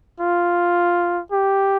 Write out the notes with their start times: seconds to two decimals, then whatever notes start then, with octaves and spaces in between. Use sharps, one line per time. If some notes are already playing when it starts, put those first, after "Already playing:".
0.20 F4
1.32 G4